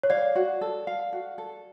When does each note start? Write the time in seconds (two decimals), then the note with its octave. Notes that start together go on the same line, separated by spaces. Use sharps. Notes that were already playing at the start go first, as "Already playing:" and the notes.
0.03 C#5
0.10 D5 F5
0.35 F#4
0.61 A4
0.87 F5
1.13 F#4
1.38 A4